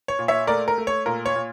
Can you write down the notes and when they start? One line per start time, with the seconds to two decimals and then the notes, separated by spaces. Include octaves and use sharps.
0.08 C#5
0.19 A#2
0.28 C#5 E5
0.47 A3 A#4 D5
0.68 A#4
0.78 A3
0.87 C#5
1.06 A#2 A#4
1.26 C#5
1.36 A#2